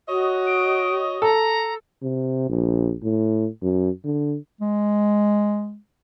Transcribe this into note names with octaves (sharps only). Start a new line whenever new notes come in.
F#4 C#5 D#5
D7
A4 A#5
C3
A#1
A2
F#2
D3
G#3